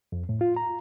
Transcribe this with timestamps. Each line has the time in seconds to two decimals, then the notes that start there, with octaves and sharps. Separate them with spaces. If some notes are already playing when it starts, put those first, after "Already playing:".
0.12 F2
0.29 A2
0.41 F4
0.56 A#5